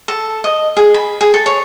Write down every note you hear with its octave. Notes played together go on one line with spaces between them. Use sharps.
A4
D#5
G#4
B5
G#4
A4
C#5